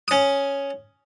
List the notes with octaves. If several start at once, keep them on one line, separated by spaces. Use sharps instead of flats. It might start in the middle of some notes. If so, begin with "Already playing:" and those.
C#4 D#6